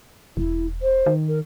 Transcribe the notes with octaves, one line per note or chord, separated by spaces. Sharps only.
E1 E4
C5
D#3
A#4